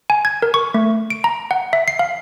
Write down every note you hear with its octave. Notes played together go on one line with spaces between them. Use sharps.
G#5
G#6
A#4
C#6
A3
D7
A#5
F#5
E5
C7
F5